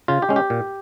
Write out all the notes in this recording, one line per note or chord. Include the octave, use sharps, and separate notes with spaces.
C#3 F4
G4
G#3 C#4
G4
A#2